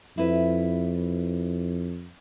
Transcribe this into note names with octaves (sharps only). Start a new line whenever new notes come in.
F2 E4 B4